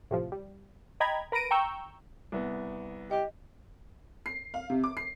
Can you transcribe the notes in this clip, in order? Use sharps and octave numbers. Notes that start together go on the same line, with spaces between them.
A2 C3 F3
G3
D#5 G5 A#5 B5 G#6
A#4 B4 A#6 D7 D#7
G5 A#5 C#6 E6 G6
C2 B3
G4 D#5
C7
F5
C3
D6
C7